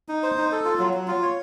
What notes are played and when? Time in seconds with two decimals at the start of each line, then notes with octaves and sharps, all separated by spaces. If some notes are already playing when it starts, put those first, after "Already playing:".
0.09 D#4
0.23 C5
0.38 D#4
0.52 A4
0.65 F4
0.79 F#3
0.93 F#3
1.07 F4
1.22 C#5